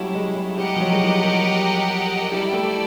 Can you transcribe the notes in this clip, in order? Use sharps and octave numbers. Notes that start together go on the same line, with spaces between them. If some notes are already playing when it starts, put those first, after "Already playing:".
Already playing: F#3 G3 A3 C#4 E4
G#3
G#3
G3 G4 A#4 D#5 F#5
F3
F#3
G#3
G3
G3
G3 E4 A4 D5 G5
A3